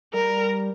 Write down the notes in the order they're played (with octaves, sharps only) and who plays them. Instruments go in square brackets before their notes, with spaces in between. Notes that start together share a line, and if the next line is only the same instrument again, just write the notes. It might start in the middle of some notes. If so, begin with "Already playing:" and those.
[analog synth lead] G3 [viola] A#4